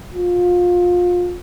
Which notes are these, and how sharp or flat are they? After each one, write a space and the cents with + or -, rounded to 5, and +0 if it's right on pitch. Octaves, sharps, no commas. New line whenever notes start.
F4 +25